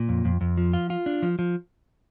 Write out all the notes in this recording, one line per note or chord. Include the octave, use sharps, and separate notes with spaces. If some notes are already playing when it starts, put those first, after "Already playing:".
Already playing: A#2
F2
F2
F2
F3
F4
F4
D4
F3
F3